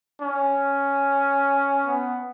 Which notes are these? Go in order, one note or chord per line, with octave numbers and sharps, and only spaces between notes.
C#4
B3